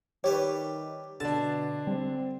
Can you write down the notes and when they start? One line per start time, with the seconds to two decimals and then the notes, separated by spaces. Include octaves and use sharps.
0.24 D#3 G3 G4 B4 C#5
1.20 B2 D3 D4 A5
1.87 G3 C4